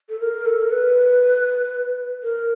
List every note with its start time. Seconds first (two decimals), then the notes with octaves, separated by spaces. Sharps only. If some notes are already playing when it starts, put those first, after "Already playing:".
0.09 A4
0.20 A#4
0.46 A4
0.62 A#4
0.71 B4
2.23 A#4